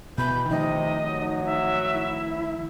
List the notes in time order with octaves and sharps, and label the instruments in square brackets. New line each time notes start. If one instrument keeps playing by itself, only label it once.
[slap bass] B2 [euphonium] E3 [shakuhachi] B5 [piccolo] G6
[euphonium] C3 [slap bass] D#3 F3 A3 [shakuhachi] D#4 [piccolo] D#5
[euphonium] F#3
[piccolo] E5
[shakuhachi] E4